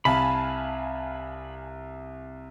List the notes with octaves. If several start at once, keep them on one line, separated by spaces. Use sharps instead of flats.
C2 F5 G#5 A5 B5